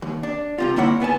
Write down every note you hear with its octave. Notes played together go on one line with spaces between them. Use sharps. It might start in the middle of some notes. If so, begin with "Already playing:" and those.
D#2
D4
C2 C3 F4
D3 A#3 E4 C#5 F#5
C#2 B3 G#5 A5